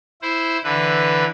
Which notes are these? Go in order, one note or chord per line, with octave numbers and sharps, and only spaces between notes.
E4 C5
D3 E3 B4